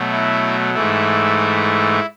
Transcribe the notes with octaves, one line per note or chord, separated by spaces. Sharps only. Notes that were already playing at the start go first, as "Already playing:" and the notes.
Already playing: B2 F#3 A3
E4
G#2 E3 A3 E4